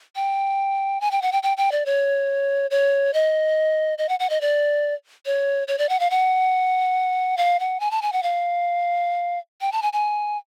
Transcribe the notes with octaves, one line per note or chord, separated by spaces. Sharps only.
G5
G#5
G5
F#5
G5
G5
G5
D5
C#5
C#5
D#5
D#5
F#5
F#5
D#5
D5
C#5
C#5
D5
F#5
F5
F#5
F5
F#5
G#5
A5
G#5
F#5
F5
G5
A5
G#5
G#5